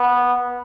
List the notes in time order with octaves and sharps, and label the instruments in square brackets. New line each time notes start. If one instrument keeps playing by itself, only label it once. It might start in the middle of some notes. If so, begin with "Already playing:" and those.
Already playing: [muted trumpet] B3